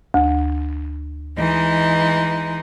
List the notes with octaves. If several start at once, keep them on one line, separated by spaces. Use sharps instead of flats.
D2
E3 G#3 D#4